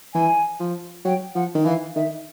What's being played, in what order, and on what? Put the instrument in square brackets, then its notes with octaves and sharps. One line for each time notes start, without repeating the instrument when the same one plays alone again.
[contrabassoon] E3 [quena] G#5
[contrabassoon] F3
[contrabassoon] F#3 [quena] G5
[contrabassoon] F3 [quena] F#5
[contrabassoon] D#3
[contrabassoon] E3 [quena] F5
[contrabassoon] D#3 [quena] E5